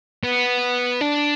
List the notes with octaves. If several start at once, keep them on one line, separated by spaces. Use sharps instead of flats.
B3
D4